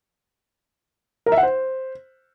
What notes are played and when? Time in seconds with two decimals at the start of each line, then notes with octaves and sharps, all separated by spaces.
1.26 A#4
1.32 E5
1.37 F#5
1.43 C5